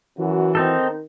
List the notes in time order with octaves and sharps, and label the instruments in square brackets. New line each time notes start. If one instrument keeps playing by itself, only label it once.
[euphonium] F#2 [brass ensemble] E3 F#4
[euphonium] D#3 [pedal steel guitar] C4 D#4 A4